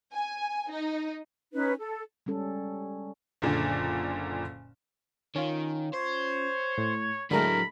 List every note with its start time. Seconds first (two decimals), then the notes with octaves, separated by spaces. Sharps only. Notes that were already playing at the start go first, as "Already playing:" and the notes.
0.13 G#5
0.71 D#4
1.53 C#4 D#4 B4
1.78 A4
2.26 G3 G#3 C#4 A4
3.42 F#1 A#2 D3
5.36 D#3 C#4 F4
5.94 C5 C#5
6.78 A2
7.31 A2 D3 F#3 G#3 A3 A#4 B5